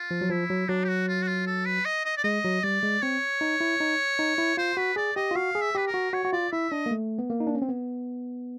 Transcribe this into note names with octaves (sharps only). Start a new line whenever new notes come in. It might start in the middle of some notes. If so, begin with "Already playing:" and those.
Already playing: F4
F3
F#3
F3 E4
F#3
F#3 D4
G4
F#4
F4
F#4
F4
A4
B4
D#5
D#5
D5
G#3 D#5
F#3
G3 D5
G#3
C4 C#5
D#4
E4
D#4
D#4
E4
F4 C5
F#4 B4
G#4 D5
G4 D#5
F4
F#4 F5
G#4
E5
G4 B4
A#4
F#4
F#4 C#5
F#4
F4 D5
E4 E5
D4 D#5
A#3
A3
B3
A#3
D#4
D4
C#4
C4
B3